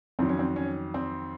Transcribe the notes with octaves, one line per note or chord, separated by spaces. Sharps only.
F2 D#3 F#3 C4
C#4
C4
C#4
C4